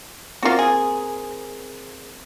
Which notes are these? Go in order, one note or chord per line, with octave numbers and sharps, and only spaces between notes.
C4 F4 F#4 A#4
G#4